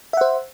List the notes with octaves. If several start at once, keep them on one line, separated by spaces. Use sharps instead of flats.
C5 E5 F#5